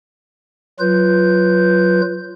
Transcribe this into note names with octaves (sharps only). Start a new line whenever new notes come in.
F#3 F4 B4 G6